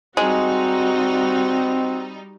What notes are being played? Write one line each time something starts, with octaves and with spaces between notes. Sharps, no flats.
G3 G#3 C4 D#4 F#4